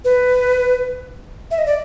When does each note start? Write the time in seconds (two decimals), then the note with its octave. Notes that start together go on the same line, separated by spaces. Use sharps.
0.05 B4
1.51 E5
1.58 D#5
1.66 D5